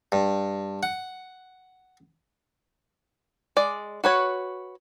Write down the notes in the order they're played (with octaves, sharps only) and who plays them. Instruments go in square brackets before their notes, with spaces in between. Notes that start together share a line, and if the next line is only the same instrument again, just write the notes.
[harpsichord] G2
F#5
[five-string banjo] G#3 D5
F#4 B4 C#5